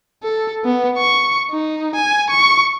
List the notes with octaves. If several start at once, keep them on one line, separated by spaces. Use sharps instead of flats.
A4
B3
C#6
D#4
G#5
C#6